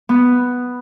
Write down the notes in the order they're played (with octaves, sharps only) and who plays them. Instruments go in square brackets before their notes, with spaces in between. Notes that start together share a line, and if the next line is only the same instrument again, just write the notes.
[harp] B3